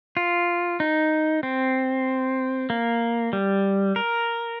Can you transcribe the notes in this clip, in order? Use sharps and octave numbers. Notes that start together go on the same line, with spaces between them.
F4
D#4
C4
A#3
G3
A#4